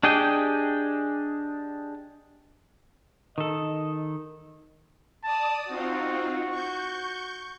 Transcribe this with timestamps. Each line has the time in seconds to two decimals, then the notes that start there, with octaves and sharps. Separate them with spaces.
0.03 D4 G4 G#4 D#5 G5
3.38 D#3 A4 D#5
5.24 D5 A5 D#6
5.68 C4 D#4 F4 F#4
6.49 C#6 G6